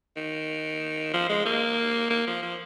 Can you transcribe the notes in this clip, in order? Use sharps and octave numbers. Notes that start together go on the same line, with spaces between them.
D#3
F3
G#3
A#3
A#3
F3
F3